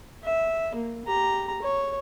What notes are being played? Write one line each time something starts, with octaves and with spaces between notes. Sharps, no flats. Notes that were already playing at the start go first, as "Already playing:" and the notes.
E5
A#3
G4 A#5
C#5